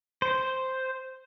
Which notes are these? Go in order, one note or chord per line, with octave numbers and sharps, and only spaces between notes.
C5